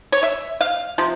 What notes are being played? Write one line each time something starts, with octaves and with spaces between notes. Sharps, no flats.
C#5
E5
F5
C3 F3